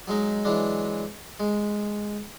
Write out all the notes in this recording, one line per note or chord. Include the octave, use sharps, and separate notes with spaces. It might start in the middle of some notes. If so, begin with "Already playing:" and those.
F#3 G#3 D#4
E3 F#3 G#3 D4
G#3